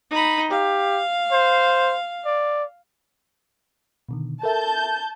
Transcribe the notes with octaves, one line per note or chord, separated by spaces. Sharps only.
D#4 B5
G4 F5
C5
D5
B2 D3 D#3
A4 A#4 E5 A5 G6